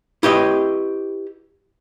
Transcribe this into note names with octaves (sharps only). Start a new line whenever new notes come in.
E4 G4 B4 D#5